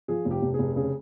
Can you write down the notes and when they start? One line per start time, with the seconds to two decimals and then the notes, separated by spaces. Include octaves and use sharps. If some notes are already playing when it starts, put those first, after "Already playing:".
0.08 F3 G#4
0.25 F1
0.31 G4
0.42 F1
0.54 G#4
0.59 F1
0.76 C#3 G#4